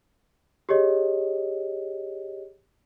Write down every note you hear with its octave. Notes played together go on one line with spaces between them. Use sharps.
G4 G#4 C#5 D#5